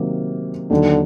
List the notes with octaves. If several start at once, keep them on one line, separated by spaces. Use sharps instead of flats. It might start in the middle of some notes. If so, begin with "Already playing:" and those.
Already playing: C3 D#3 F#3 A#3
D#2 D3 D#3 F#3